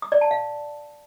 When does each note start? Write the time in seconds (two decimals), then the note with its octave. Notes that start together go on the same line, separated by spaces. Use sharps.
0.02 D#6
0.12 D5
0.21 A5
0.31 F5